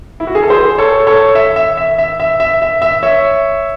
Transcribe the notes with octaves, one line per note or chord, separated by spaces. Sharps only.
E4
F#4
G#4
A4
G#4 C5
A4 C#5
A4 C#5
E5
E5
E5
E5
E5
E5
E5
E5
C#5 E5